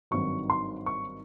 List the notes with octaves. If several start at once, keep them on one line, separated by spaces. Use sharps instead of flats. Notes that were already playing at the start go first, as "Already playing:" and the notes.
G#1 G2 D#3 F#3 C#6
C6
C#6